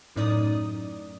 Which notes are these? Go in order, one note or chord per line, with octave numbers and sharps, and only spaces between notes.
F#2 A2 D#4 D5 D#6